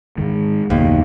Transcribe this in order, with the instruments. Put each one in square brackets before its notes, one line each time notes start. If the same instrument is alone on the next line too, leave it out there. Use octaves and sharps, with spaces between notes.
[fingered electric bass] G#2 D#3 [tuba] G#3
[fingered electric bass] F#1 B2 [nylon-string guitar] D#2